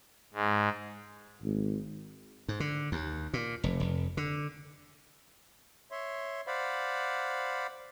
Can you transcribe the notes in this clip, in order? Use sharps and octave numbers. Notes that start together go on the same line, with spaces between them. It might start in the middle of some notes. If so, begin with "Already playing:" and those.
G#2
G#1
G#2
D3
D#2
A#2
F1
F1
D3
C#5 E5 C6
C5 D5 F5 F#5 B5